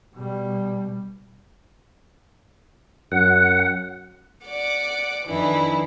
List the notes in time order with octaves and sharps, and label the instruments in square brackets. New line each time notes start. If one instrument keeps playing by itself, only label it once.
[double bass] B2 G3
[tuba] F#2 [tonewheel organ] F#5
[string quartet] D5 F#5 D6
F2 D#3 E3 D4 E4